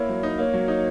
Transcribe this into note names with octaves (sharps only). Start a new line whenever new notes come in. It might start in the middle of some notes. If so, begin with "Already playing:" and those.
Already playing: A#3 E4 C#5
F#3
D#4
A#3 C#5
F#3
D#4